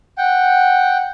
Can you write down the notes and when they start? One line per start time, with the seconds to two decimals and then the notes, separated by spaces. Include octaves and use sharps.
0.18 F#5 G5